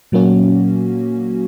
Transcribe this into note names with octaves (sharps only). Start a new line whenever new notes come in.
A#2 F#3 A#3 C#4 F#4